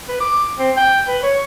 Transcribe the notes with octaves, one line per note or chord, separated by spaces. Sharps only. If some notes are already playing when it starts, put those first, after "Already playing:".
B4
D6
C4
G5
B4
C#5